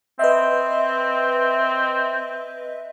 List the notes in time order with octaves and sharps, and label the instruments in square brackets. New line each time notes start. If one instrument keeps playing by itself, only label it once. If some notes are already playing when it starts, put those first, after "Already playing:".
[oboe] C4 [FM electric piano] B4 D#5 E5